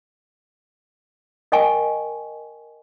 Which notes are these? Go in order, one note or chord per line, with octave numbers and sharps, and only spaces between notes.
A#4 D#5 G5 G#5 C#6